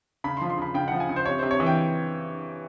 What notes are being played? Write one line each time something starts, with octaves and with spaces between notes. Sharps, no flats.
C#3 B5
C6
F3
C6
C#3 B5
C#3 G5
F3 F#5
G#5
C#3
C5
C3 C#5
C3 C5
C#5
E3
G5